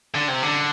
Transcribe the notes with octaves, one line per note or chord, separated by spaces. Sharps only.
D3
C3
D3